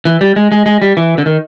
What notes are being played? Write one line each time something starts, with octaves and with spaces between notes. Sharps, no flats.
E3
G3
G#3
G#3
G#3
G3
E3
D3
D#3